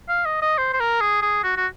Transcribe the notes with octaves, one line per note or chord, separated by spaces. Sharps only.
F5
D#5
D#5
C5
C5
A#4
G#4
G#4
F#4
F#4